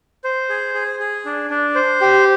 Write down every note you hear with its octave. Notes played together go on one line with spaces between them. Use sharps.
C5
G#4
G#4
G#4
D4
D4
C5
G4